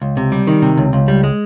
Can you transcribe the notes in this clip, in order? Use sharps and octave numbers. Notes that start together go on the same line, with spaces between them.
C#2
C3
G3
D#3
C3
C#2
C#2
G3
G#3